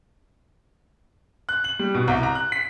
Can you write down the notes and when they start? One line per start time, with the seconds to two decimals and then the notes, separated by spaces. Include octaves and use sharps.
1.49 F#6
1.64 F#7
1.79 G3
1.94 B2
2.08 C2
2.23 A#5
2.35 F#6
2.52 B6